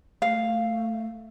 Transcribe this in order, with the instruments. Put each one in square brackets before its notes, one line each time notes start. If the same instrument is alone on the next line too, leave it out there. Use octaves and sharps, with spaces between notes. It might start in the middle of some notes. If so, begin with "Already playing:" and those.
[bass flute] A3 [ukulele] F5